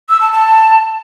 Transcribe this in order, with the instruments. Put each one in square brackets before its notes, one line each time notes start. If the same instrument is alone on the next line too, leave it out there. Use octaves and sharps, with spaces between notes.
[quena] E6
A5
A5